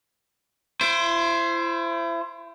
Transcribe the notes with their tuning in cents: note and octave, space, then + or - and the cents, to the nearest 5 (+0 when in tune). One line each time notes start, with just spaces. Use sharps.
E4 +35 C5 +0